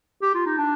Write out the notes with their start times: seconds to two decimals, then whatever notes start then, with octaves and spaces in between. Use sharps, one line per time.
0.22 G4
0.35 F4
0.46 D#4
0.58 D4